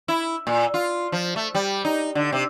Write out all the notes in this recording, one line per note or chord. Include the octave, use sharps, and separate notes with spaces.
E4
A#2
F4
F3
A3
G3
D#4
D3
C3